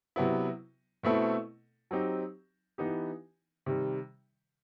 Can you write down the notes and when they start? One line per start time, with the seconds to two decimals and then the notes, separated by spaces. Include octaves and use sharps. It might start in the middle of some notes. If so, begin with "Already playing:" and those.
0.16 C3 F#3 B3 E4
1.03 B2 A3 C4 E4 A4
1.91 F#3 C4 D#4 G4
2.78 E3 B3 D#4 G4
3.66 C3 D#3 G3